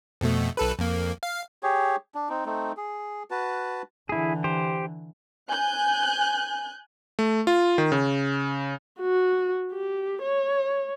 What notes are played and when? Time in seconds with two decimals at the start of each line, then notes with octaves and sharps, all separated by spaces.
0.21 F2 B2 A3
0.57 B1 A4 B4
0.79 F2 A#3
1.23 F5
1.63 G4 G#4 C#5
2.15 D4
2.29 C4 D#4
2.46 A3 C4 D#4
2.77 G#4
3.31 F#4 B4 A5
4.09 D3 E3 E4 G#4
4.44 G4 C5
5.49 G#5 F#6 G6
7.19 A3
7.47 F4
7.78 D#3
7.92 C#3
9.00 F#4
9.72 G4
10.22 C#5